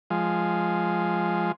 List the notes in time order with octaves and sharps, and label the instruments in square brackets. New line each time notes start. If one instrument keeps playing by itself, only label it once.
[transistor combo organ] F3 G#3